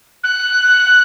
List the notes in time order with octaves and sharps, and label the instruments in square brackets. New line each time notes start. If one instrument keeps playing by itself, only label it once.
[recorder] F#6